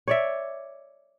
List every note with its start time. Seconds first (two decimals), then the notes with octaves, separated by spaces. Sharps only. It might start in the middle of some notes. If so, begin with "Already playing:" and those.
0.08 C#5 D5 E5